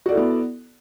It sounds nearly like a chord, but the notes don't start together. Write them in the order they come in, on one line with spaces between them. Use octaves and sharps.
F#4 D5 A4 E4 B3